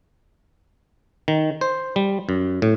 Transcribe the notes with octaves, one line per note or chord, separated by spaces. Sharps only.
D#3
C5
G3
F#2
A2